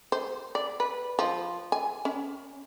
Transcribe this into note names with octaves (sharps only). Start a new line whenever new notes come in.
C5
D5
B4
F3
G#5
C#4